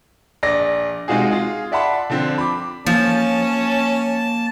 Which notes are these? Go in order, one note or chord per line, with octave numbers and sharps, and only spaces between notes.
A#1 D5 A#6
C3 G#3 D#4 F4 F#4 G#4
F4 G#4
D5 E5 F#5 A5 B5 C6
D3 F3 C4 D4
B5 D6
F3 A#3 C#4 A5